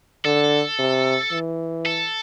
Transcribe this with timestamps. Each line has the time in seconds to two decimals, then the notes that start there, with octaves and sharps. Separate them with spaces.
0.25 D3 A4
0.79 C3
1.32 E3
1.86 A4